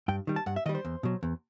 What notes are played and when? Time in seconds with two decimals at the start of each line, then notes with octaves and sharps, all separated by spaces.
0.08 G2 G5
0.27 D#3 G3
0.36 A5
0.46 G2 F#5
0.56 E5
0.66 D#3 D#5
0.69 G3
0.75 C5
0.85 E2
1.03 B2 F#3
1.23 E2